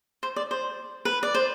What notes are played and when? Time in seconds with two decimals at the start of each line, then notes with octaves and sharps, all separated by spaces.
0.23 C5
0.36 D5
0.51 C5
1.05 B4
1.23 D5
1.35 C5